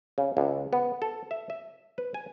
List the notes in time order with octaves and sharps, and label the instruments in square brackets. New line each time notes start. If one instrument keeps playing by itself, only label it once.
[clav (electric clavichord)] C#3
C#2
B3
A4
E5
E5
B4
G#5